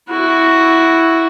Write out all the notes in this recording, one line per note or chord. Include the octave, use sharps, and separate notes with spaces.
E4 F#4